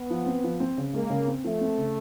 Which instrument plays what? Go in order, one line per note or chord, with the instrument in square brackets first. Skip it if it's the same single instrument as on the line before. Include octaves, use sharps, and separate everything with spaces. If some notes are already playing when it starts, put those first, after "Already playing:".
Already playing: [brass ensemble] B3
[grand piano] F3
C4
F3
C4
C#3
[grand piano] G#3 [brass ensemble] A#3
[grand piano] C#3
C4
[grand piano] F3 [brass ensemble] A3
[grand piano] C4
C#3